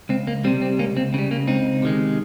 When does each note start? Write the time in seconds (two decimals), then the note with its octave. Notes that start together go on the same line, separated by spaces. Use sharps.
0.09 C#2 C4
0.27 A#3
0.44 C3 G3 C4
0.62 C4
0.78 C#2 A#3 C#4
0.97 C4
1.14 C#3 C4
1.18 G3
1.31 A#3
1.48 C#2 C4 D#4
1.82 C3 D#3 G#3